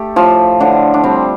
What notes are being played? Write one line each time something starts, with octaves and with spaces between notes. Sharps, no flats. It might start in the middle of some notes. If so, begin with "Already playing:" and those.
Already playing: A3 G4 A4
A2 F3 F4
A2 D3 D4
D4
G3 C4